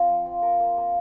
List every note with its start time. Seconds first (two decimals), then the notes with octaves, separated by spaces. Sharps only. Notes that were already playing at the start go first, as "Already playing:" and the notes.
Already playing: C4 F4
0.09 F3
0.26 F3
0.42 A#4
0.60 A#3
0.77 A#3